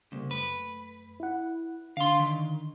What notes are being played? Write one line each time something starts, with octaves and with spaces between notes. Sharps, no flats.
C2 C#3 A3 A#3
F#2 A3 B4
E4 F#5
D3 D4 F5 C6
D#3